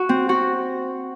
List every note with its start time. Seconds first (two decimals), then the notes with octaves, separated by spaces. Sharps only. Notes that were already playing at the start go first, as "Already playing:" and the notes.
Already playing: F#4
0.09 C4
0.29 F#4